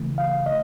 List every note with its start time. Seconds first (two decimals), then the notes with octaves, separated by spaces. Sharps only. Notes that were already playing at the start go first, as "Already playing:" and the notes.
Already playing: C#3 E3 A3
0.18 F5
0.46 D#5